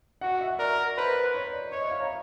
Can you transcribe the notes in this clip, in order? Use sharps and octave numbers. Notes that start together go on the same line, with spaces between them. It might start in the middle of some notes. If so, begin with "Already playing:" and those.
F#4 F#5
E5
A#4 D5
B4 C5
C#5
D5
C#5 D#5
E5
F5
A#5